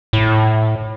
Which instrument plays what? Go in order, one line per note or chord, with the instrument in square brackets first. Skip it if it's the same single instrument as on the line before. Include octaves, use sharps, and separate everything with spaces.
[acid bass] A2